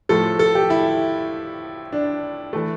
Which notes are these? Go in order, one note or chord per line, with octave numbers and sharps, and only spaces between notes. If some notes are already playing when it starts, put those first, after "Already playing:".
A2 F3 A3 A4
A4
G4
E4
D4
E3 A3